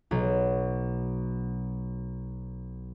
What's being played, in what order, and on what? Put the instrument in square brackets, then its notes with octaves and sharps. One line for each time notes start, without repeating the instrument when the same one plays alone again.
[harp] B1 F#3